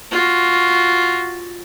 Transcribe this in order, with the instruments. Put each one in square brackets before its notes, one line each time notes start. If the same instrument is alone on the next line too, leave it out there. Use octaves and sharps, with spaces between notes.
[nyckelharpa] F4 F#4